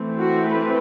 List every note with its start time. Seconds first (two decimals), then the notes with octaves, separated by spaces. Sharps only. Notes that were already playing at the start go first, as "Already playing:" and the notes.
Already playing: E3 A3 C4
0.18 F#4
0.46 B4